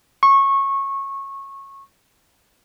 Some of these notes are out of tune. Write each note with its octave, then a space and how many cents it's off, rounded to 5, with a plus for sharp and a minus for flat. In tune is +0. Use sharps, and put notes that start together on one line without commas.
C#6 -20